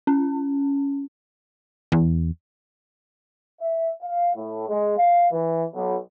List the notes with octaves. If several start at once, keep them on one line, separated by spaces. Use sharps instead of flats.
C#4
E2
E5
F5
A2
G#3
F5
E3
B1